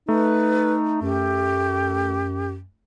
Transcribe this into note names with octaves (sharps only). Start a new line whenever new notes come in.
A3 D#4 B4
F#2 G4